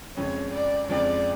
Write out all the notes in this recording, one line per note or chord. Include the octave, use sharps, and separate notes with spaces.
F2 C#3 F3 G#3 C#5
D5
F2 C#3 F3 G#3 D5